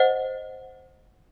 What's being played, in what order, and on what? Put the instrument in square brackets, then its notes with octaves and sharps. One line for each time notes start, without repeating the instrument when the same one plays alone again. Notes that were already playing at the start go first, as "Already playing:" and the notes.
Already playing: [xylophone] C5 D#5 F#5